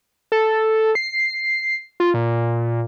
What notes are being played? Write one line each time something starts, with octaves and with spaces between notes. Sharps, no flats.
A4
C7
F4
A#2